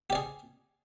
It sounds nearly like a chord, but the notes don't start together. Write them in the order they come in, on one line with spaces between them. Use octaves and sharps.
G4 D5 G#4